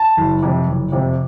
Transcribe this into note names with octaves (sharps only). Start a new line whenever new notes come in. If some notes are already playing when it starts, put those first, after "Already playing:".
Already playing: A5
F#1
F2 C3
F#1
F2 C3